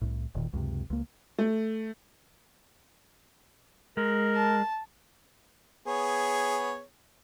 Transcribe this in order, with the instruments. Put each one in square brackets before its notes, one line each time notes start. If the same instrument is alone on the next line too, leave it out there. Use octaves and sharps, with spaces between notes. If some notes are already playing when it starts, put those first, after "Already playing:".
[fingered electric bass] C2 A2
E1 A#2 D#3
C#2 F#2 C3
C#2 A#3
[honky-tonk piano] A3
[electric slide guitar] G#3 [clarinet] A#4
[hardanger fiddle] A5
[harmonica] B3 G#4 C#5